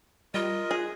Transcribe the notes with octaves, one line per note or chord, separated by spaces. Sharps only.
G3 F4 A#4 D#5
G#4 F#6